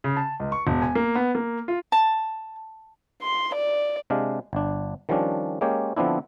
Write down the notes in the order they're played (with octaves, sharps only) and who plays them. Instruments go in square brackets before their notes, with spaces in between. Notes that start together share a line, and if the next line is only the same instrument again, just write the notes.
[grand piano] C#3
A5
C#2
C#6
E1
G#5
A#3
B3
A#3
F4
[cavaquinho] A5
[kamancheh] C6
D5
[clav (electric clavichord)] C3 G#3 D4 F5
G1 D4
D#3 F3 G3 C#4 D4
G#3 A#3 C#4 G4 C#5
D3 F3 B3 C4 D4 E4